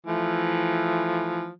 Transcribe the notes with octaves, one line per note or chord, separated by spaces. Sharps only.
E3 F3 A3